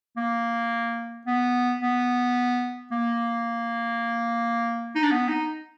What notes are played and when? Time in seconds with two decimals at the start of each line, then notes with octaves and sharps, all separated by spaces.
0.17 A#3
1.27 B3
1.82 B3
2.91 A#3
4.95 D#4
5.03 D4
5.11 B3
5.29 D#4